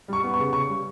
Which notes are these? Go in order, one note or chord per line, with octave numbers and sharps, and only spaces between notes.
G3 C#6
B3
C#6
C#3
C#3 C#6
G3